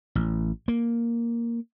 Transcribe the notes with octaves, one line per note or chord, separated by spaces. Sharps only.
A1
A#3